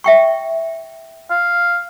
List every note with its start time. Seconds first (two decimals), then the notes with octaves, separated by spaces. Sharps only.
0.04 E5 G5 C#6
1.31 F5